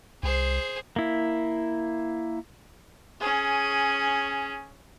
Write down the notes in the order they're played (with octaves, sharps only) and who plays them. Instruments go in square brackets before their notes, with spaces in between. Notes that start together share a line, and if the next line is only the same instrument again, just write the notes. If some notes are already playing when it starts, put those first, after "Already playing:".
[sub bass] C2 [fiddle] G#4 C5
[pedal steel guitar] A#3 E4
[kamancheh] C#4 G#4